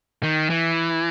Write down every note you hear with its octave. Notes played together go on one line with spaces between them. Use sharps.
D#3
E3